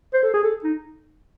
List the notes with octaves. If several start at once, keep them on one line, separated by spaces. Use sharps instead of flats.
C5
A4
G#4
A4
D#4